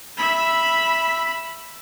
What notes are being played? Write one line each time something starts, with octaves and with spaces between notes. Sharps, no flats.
E5 B5